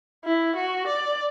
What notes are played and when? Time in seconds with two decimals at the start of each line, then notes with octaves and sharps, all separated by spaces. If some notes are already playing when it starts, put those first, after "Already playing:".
0.24 E4
0.55 F#4
0.87 D5